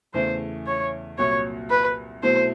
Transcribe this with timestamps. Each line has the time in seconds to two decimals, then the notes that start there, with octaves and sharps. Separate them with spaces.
0.14 E2 C#3 E3 A3 C5
0.67 C#5
1.18 C2 A#2 F#3 C#5
1.70 B4
2.23 B2 F#3 A3 C4 E4 C5